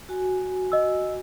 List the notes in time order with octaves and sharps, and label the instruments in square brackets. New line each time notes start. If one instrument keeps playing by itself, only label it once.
[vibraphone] F#4 G#5
[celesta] D#5 E6